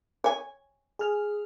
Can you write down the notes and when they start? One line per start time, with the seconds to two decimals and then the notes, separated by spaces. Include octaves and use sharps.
0.24 C#5 G#5
0.99 G#4 F6